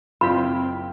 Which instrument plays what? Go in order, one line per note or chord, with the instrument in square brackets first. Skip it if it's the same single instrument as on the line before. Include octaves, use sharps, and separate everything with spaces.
[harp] F#1 G5 B6 [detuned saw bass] C4 [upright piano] E4 F4 [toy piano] B5